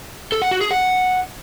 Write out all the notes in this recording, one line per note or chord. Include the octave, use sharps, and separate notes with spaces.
A4
F#5
F#4
G#4
F#5